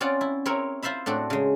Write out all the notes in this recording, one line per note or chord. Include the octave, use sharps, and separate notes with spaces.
C4 C#4 F4 D5 F#5
E4
C4 E4 A#4 C#5
E4 F4 C5 E5 B5
A2 C4 D4 F#4
C#3 G#3